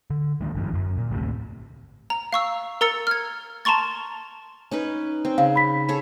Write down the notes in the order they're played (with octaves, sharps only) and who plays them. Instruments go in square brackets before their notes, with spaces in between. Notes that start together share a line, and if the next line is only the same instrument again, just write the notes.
[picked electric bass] D3
D#3 G#3 A#3 D4
G1 F#2 E3
F#2
A#2
G#1 D2 A2 C3
[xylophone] A#5
F5 C#6 E6
A#4 A#5 E6 A6 C#7
F6 G#6
A5 A#5 C6 C#6 A6
[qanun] C#4 D#4 B4
C4
[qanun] C#3 [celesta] F5
[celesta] B5 B6
[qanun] G#4 A4 C#5